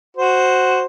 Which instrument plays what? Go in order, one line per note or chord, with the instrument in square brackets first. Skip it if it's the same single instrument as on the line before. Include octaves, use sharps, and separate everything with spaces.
[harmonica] F#4 C5